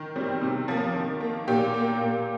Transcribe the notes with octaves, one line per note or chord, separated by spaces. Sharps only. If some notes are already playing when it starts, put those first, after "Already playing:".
Already playing: D#3
G3 C4
C3
F3 A#3
D#3
A#3
A#2 G4
A#3
A#2